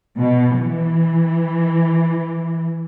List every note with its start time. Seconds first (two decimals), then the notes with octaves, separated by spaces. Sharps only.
0.17 B2
0.59 E3